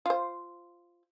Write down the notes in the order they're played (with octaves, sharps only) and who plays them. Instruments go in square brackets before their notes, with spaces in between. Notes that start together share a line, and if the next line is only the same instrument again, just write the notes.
[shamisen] F4 C5